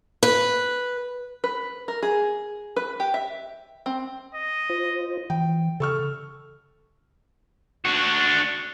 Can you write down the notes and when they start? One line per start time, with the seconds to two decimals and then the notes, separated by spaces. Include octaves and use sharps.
0.23 B4
1.44 B4
1.88 A#4
2.03 G#4
2.76 B4
3.00 G4
3.14 E5
3.86 C4
4.34 D#5
4.70 F4 C5
5.30 E3 G5
5.80 C#3 A4 C#6 F6
7.85 D4 F#4